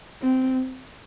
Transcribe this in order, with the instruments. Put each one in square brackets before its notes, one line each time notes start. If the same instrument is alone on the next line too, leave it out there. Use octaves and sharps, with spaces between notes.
[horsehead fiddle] C4